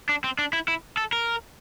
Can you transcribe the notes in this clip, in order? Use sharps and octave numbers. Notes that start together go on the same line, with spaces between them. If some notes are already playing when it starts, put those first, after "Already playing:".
D4
C4
D4
E4
E4
A4
A#4